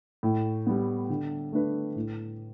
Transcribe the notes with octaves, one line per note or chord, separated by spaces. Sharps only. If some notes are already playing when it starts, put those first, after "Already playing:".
A2
G3 B3
D3
A3 D4 B4
A2